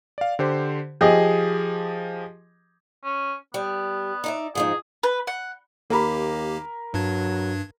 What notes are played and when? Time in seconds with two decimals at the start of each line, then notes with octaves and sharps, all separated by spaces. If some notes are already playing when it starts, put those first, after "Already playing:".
0.18 D5 F5
0.39 D3 G4 C5
1.01 F3 G4 G#4 D#5
3.04 C#4
3.54 G3 B3
4.24 D#4 D5 E5
4.55 G#2 F3 D#4 G#4
5.03 B4
5.27 F#5
5.90 D#2 A#3 G4 A#4 A#5 B5
6.94 G2 F#3 D4 G#6